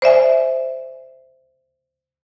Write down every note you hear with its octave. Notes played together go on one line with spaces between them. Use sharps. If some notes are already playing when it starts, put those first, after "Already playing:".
C5 D5 E5 G#5